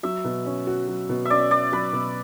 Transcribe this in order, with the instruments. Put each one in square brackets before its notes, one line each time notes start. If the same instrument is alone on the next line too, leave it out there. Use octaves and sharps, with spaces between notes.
[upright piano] F#3 [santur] E5
[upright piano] B2
C#4
F#4
F#3
B2
[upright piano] C#4 [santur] D5 E5
[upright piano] F#4 [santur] D5
[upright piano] F#3 [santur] B4
[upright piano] B2